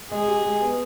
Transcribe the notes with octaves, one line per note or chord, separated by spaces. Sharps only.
G#3 G#4
G4
G#3
B3